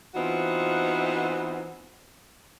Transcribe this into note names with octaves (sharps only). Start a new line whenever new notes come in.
E3 B3 C4 D#4 F4 F#4